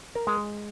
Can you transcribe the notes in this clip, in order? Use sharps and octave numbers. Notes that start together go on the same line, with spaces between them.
A#4
G#3